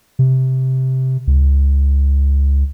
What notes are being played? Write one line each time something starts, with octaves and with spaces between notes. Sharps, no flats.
C3
C#2